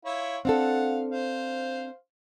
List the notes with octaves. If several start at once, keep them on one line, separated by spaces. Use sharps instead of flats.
E4 F4 C#5
C4 D4 A4 F5 F#5
C5 F5